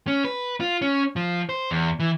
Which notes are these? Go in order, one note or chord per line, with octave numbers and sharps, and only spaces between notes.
C#4
B4
F4
C#4
F3
C5
E2
E3